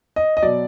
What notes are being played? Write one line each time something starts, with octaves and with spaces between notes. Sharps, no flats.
D#5
D#5
B2 F#3 D5